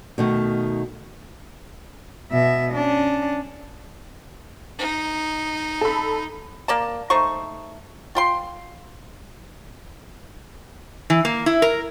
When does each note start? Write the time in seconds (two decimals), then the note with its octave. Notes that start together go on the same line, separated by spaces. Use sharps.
0.18 B2 D#3 A3
2.32 B2 E5
2.74 C#4 D4
4.79 D#4
5.81 A4 B5
6.68 A#3 D5 A5
7.10 A3 D#4 C5 C#6
8.15 F4 G5 C6
11.10 E3
11.25 A#3
11.46 E4
11.62 A#4